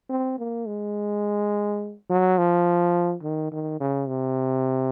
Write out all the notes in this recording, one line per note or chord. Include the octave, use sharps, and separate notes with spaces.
C4
A#3
G#3
F#3
F3
D#3
D#3
C#3
C3